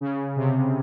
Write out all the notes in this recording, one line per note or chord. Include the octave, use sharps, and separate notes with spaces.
C#3
C3